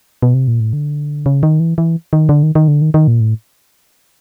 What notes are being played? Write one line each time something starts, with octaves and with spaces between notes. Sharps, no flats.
B2
C3
A#2
A2
D3
C#3
D#3
E3
E3
D#3
D3
D#3
D#3
D3
D#3
D#3
A#2
A2